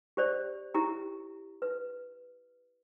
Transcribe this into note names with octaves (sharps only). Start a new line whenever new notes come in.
G4 C5 D5
E4 G4 A#5
B4